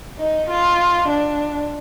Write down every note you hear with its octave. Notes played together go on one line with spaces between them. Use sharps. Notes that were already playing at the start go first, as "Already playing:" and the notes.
D#4
F4
D4